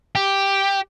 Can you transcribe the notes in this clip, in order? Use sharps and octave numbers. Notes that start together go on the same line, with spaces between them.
G4